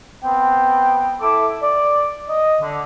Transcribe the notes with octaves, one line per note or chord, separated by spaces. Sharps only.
B3 C4 G5
E4 A4 D6
D5
D#5
D3